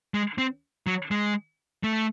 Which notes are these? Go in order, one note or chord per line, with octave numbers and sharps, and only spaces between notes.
G#3
C4
F#3
G#3
A3